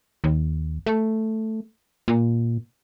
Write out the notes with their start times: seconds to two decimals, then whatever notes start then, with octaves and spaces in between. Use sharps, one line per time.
0.24 D#2
0.86 A3
2.08 A#2